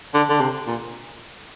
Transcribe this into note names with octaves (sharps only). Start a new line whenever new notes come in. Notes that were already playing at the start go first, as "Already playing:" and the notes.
D3
D3
C3
A#2